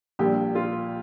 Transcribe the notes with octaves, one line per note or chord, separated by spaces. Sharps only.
A#1 A#2 G3 G4
F4